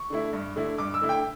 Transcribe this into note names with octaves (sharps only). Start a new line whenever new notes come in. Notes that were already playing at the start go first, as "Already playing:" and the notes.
Already playing: C#6
D3 A3 E4
G2
D3 A3 E4
G2 D6
E6
D3 A3 E4
G5